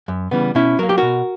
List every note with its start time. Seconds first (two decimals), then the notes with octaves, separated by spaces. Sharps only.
0.08 F#2
0.31 C#3 E3 G3 B3
0.55 B2 C#4 E4
0.79 F#3 A#3 A#4
0.89 G4
0.98 B2 F#4 A#4